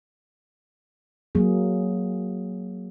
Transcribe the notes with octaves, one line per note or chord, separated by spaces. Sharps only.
F#3 A#3 G#4